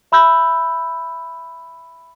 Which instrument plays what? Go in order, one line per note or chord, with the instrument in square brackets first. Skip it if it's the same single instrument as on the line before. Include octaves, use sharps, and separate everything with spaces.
[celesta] E5 B5 E6 G6